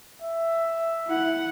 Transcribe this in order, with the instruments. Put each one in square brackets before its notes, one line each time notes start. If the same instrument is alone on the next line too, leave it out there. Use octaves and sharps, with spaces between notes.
[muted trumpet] E5
[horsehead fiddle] E4 F#5